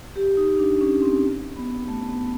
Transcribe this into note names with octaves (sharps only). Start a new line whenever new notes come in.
G4
D#4
D4
C#4
C4
B3
A3
B3